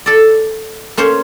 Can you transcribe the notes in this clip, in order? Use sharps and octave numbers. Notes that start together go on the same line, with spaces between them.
A4 D5
A#3 C#4 C5 C#5